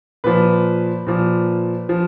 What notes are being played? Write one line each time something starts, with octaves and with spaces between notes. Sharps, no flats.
A#2 F3 B4
A#2 F3
F3